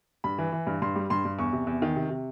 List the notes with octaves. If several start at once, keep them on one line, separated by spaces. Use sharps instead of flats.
G2 B5
E3
E3
G2
G2 C6
G3
G2 C6
G2
E2 C#6
C3
E2
D#3
C3
C3